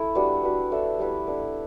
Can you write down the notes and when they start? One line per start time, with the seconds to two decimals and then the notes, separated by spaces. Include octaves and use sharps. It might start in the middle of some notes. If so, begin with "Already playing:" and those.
Already playing: A3 E4 A4 E5
0.15 G3 B3 D4 F#4
0.42 B3 D4 F#4 B4
0.72 A3 D4 A4 E5
0.99 G3 B3 E4 B4
1.27 B3 D4 A4